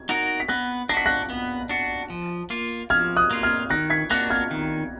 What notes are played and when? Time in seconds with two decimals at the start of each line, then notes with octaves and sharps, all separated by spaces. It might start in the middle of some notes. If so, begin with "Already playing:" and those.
Already playing: G#6
0.09 D#4 F#4 A#4
0.40 B6
0.48 B3 F#6 A#6
0.89 D4 A#6
0.94 F#4 B6
1.06 F#6 A#6
1.30 B3
1.69 D4 F#4
2.10 F3
2.50 A#3 F4
2.90 F3 F6 G#6
3.16 D#6 F#6
3.31 A#3 F4
3.43 F6 G#6
3.70 D#3 F#6 A#6
3.90 G#6 B6
4.10 A#3 D4 F#4 F#6 A#6
4.30 F6 G#6
4.51 D#3